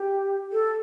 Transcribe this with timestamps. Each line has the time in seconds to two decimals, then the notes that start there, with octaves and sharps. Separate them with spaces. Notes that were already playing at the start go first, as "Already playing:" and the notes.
Already playing: G4
0.52 A4